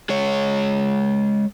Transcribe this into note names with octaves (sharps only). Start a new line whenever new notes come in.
G#3 C#5